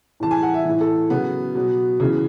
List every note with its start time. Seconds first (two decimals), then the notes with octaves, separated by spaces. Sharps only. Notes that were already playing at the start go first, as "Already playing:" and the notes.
0.20 A2 E3 A5
0.31 G#5
0.43 F#5
0.54 E5
0.65 A2 E3
0.81 A4
1.10 C#3 F#3 B3
1.55 B2 F#3
2.00 C#3 E3